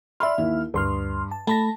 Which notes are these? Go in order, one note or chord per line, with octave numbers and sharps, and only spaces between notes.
D5 E5 B5 C6 F6
D#2 E4
D2 G2 C6 F6
A5
A3 A5 B5 A#6